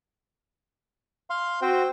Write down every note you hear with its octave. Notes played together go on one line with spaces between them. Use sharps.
F5 C6
C4 F#4 C5 G5